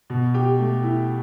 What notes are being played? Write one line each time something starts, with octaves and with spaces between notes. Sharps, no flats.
B2
G4
A3
E4